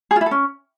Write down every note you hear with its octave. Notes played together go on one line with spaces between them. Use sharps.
G#4
F4
E4
A4
C#4